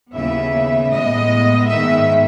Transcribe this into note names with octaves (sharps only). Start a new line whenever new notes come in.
D#2 C#3 E3 B3 E5
A2 G#3 B3 D#5
G#2 D#3 G#3 B3 E5